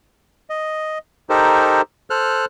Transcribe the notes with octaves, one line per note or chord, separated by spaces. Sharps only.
D#5
D#4 G4 A4 A#4 C5
A4 C5 F6 F#6